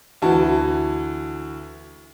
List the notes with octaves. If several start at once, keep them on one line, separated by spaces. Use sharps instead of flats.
D2 E3 F#4 A5